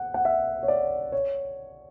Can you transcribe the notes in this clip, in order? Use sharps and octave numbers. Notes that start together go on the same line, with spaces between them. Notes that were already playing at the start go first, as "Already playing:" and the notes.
Already playing: F#5
F#5
E5
C#5
D5
C#5